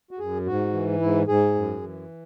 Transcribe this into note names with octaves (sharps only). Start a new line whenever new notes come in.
F#4
F#2 G#4
G#2 F#4
E3
G#2 E4
G#2 G#4
F#2
E3